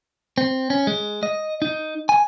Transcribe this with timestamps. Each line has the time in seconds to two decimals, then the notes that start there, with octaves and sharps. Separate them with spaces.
0.38 C4
0.70 C#4
0.87 G#3
1.23 D#5
1.62 D#4
2.09 G#5